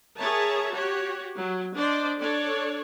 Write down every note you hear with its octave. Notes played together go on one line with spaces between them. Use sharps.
G#4 A#4 C#5 E5 A5 A#5
F#4 G4 C#5
F#3
D4 C5 D5 D#5
D4 A4 C#5 D5